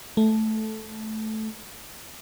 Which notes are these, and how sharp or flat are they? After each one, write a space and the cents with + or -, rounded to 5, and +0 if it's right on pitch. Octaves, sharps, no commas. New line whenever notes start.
A3 -10